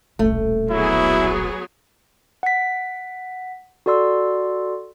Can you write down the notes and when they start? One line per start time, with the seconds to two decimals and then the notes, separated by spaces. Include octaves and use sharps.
0.19 D#1 B1 A3
0.71 F#3 B3 E4 G#4
2.43 F#5 B6
3.86 F#4 A4 D5 C6 E6